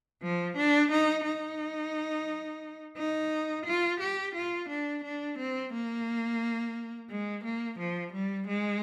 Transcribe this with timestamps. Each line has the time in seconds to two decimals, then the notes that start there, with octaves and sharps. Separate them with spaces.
0.22 F3
0.57 D4
0.91 D#4
1.26 D#4
2.97 D#4
3.66 F4
4.00 G4
4.35 F4
4.69 D4
5.04 D4
5.38 C4
5.73 A#3
7.10 G#3
7.44 A#3
7.79 F3
8.13 G3
8.48 G#3